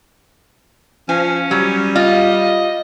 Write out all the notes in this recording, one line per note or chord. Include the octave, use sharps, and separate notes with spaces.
F3 C#4 G#5
F#3 G3
F4 D#5